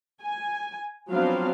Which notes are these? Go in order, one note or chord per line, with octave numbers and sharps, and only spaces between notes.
G#5
F3 F#3 B3 C4 D4 F5